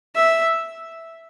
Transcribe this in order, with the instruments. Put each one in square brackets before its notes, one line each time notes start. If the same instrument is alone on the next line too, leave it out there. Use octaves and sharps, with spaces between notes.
[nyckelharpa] E5